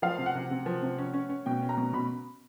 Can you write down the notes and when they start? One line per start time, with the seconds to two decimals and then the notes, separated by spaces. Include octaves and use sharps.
0.02 F3 F5
0.18 C3
0.26 F#5
0.35 C3
0.51 C3
0.66 F3
0.83 C3
0.98 C#4
1.14 C#4
1.29 C#4
1.46 B2 G5
1.62 C#4
1.69 A#5
1.78 B2
1.93 B2 B5